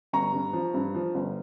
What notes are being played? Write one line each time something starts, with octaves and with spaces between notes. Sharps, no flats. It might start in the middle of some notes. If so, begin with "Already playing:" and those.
G1 A#5 C#6
G2
F3
G2
F3
G1